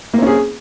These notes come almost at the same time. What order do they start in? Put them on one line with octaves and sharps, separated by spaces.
A#3 C4 C#4 G#4